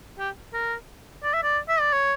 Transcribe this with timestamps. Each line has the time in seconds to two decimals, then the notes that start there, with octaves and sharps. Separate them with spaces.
0.19 G4
0.53 A#4
1.24 D5
1.34 E5
1.43 D5
1.69 E5
1.80 D5
1.93 C#5